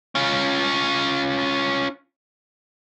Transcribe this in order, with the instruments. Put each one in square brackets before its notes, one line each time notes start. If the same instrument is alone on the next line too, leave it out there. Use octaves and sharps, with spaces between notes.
[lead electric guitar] C#4 F4